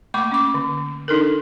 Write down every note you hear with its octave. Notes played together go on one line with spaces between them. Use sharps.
A3 A#3 B5 C#6 D6
C#4 D6
D3
D4 D#4 A4 A#4